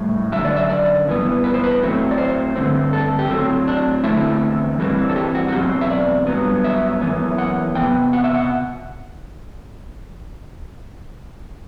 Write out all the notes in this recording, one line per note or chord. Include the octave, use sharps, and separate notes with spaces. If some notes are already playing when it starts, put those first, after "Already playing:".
Already playing: A2 G3
F#2 D3 G3 E5
D5
E5
D5
G2 E3 B3
B4
C5
B4
A2 F#3 A3 C4
D5
C5
G2 D3 A3 C4
A4
G4
A2 F#3 C4 A4
D4
E2 D3 A3 C4 E4
G2 E3 G3 C4
A4
G4
F#4
F#4
E2 B2 F#3 C4 G4
E5
D5
G2 F#3 B3
E5
F#2 E3 B3
F#5
G3 B3 G5
C3
F#5
E5
F#5